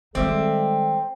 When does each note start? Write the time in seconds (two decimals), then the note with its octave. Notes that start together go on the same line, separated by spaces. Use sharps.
0.15 D#3 G3 G#3 C4 A4 D5 E5 F5